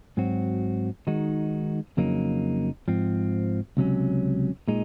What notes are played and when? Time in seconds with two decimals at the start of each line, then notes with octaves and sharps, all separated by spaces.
0.17 G#2 F#3 C4 F#4
1.07 D#3 G#3 D#4 F#4
1.97 F2 C#3 F#3 A#3 D#4
2.88 G#2 F3 C4
3.77 C#2 C3 F#3 C#4
4.68 A#2 G#3 D#4